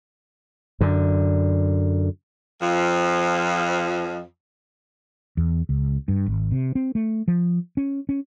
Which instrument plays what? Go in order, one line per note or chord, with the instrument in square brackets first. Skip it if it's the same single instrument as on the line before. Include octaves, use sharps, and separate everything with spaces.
[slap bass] F#2 D3
[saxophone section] F2 F3
[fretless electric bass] E2
C#2
G2
G#1
C3
C4
A3
F3
C#4
C#4